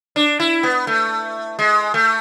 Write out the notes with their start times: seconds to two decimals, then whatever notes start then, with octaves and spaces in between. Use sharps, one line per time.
0.16 D4
0.40 E4
0.63 B3
0.87 A3
1.59 G#3
1.94 A3